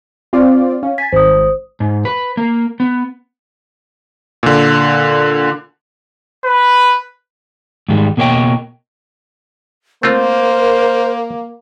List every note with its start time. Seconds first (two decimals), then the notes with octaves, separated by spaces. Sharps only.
0.33 C4 F4 D5
0.83 C#4 F5
0.98 G#5 A6 B6
1.12 G#1 C5 D#6
1.80 G#2
2.05 B4
2.37 A#3
2.80 B3
4.43 A#2 D3
6.45 B4
7.89 G#2 D#3 G3 G#3
8.17 B2 A#3 G#4 C#5 D#5 G5
10.03 A3 A#3 C4 F4 A#4 C5